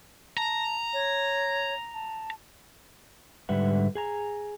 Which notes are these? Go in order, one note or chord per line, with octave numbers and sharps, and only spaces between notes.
A5 A#5
C#5
A5
G#2 D3 G3 B4 E5 F#5
G#4 G#5 A#5